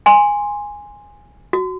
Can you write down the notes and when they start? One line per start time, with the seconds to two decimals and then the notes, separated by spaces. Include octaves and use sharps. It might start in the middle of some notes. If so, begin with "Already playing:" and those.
0.06 G#5 C6
1.53 F#4